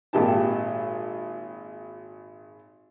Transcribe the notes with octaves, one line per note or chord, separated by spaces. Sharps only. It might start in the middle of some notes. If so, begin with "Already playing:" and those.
G#1 A#2 G4 A5